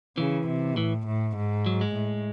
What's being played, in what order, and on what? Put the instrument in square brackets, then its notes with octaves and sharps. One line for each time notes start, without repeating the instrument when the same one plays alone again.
[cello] C#3 [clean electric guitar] E3
[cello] C3
[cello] A2 [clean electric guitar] E3
[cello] A2
G#2
[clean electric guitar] F#3
G#3
[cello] A2